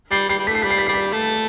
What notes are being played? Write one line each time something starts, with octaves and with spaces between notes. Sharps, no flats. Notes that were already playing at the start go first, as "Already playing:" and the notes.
G3 C7
G3 C7
G3
A3 B6
C7
G3 B6
C7
B6
G3 C7
B6
A3